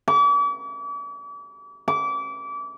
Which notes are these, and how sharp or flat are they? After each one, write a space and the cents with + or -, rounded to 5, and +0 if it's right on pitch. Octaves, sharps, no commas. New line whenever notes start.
D6 -45
D6 -30